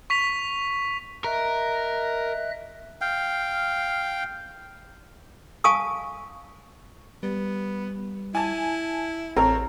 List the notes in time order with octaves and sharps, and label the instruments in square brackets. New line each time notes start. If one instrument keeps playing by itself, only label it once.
[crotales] C#6 B6 F7
[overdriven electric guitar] A#4 [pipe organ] D#5 E5 F#6
[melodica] F5 G5
[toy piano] F5 G#5 A5 C#6 D#6
[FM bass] G3 [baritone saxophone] B3
[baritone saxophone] E4 [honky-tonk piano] G#5 A5
[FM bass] A1 [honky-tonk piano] C4 A4 C#5 [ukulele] A#4